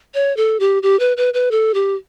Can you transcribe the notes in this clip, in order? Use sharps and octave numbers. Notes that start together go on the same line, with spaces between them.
C#5
A4
G4
G4
B4
B4
B4
A4
G4